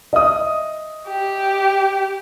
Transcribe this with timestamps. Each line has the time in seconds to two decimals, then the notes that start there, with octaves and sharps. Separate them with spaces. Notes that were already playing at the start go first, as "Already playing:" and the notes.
0.13 D#5 E5 D#6
1.08 G4